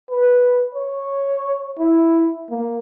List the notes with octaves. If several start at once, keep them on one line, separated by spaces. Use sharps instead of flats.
B4
C#5
E4
A#3